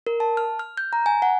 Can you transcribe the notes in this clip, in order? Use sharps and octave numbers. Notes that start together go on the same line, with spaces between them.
A#4
A5
F6
F6
G6
A#5
G#5
F#5